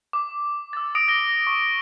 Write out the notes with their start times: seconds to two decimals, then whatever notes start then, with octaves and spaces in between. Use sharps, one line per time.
0.13 D6
0.73 E6 A6
0.95 D#6 A#6 D7
1.08 A#6 G7
1.47 C#6